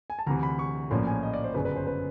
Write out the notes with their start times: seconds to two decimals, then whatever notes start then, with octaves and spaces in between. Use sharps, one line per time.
0.10 G#5
0.19 A5
0.27 D2 C3 E3 A#5
0.43 B5
0.59 C#6
0.90 A#1 A2 F3 A#3 C#4 C6
1.07 G#5
1.23 D#5
1.34 D5
1.44 C5
1.54 G1 F#2 C#3 B4
1.65 B4
1.76 C5
1.87 B4